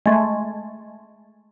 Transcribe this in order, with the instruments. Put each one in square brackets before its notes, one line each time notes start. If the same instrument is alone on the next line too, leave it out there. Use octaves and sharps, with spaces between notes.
[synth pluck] G#3 A3